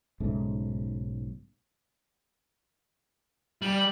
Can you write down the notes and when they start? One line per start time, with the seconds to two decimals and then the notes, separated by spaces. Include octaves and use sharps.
0.20 B1 G#2 C#3 A3
3.62 G3 F#7